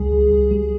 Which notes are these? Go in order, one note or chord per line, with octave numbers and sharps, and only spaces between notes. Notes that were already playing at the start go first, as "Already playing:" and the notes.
Already playing: C#2 G3 G#4
C#2
C#2
G3